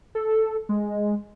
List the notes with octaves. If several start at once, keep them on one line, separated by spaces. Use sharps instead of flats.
A4
G#3